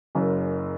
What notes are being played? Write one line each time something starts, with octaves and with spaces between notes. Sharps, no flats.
F#1 F#2 C#3